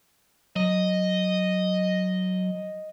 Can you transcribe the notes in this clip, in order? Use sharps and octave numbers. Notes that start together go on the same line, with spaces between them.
F#3 D#5